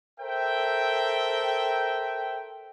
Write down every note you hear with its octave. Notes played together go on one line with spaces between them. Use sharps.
A4 A#4 C5 E5 G5